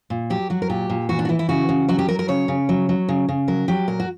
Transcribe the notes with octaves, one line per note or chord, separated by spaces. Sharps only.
A#2
F#3 G4
F#3 F#4
A#4
A#2 G4
A#2
E3 F#4
D4
F#4
E3 E4
E4
C#3 F#4
C#3
F#3 F#4
G4
F#3 A#4
A#4
C#3 C#5
C#3
F#3
F#3
C#3
C#3
F#3 A#4
F#3 G4
A#2 A#4
F#4